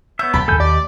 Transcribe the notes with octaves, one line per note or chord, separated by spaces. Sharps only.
B3 C#5 E5 G6
D1 B1 G5 A5 B5
D#2 D#3 A3 A4 G#5 G6
G4 D5 D#5